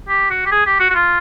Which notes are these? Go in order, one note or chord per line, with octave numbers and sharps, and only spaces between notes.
G4
F#4
G4
G#4
G4
F#4
F#4
F4